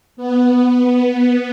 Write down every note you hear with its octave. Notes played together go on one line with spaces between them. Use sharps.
B3